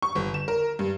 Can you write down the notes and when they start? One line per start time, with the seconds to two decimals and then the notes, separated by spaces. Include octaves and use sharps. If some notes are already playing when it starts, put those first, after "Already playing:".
0.02 C#6
0.15 G1
0.34 E7
0.48 A#4
0.79 G2